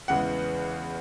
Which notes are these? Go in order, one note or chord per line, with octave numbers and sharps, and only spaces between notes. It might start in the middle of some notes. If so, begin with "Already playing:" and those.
E2 C#3 E3 G#3 F#5